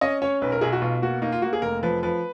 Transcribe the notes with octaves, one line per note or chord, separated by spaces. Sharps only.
C#4 D#5
C#4 C#5
B1 B4
A#4
B1 G#4
F#4
B2 F4
A#3 F#4
A#3 D#4
F4
A#3 F#4
G#4
F1 A#4
F3 B4
F3 B4